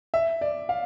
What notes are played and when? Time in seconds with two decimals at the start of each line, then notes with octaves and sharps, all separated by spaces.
0.14 E5
0.41 D5
0.69 F5